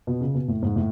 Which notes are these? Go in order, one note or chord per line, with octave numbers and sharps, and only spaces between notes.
B2
C#3
B2
A2
G#2
A2